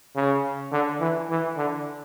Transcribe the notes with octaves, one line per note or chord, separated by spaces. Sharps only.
C#3
D3
E3
E3
D3